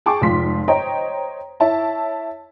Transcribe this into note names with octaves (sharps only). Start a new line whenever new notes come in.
G#4 G5 A5 C#6 D6
F1 G#2 F3 F4 C6 B6
C5 C#5 D#5 G5 A#5
E4 C#5 E5 A5